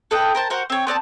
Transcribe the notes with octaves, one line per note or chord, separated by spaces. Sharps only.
A4 B4 D#5 G5
A#4 C5 A5
F#4 A#4 C5 F#5
C4 C#5
B3 C4 D5 A5